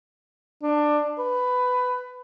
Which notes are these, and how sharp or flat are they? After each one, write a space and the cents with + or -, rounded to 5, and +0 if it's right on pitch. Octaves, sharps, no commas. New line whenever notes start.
D4 +15
B4 +15